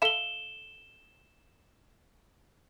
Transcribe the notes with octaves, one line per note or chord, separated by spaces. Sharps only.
A4 E5 F5 E7 G7